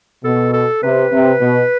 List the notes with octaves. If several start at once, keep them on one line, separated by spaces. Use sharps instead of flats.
B2 A4
A4
C3 B4
C3
B2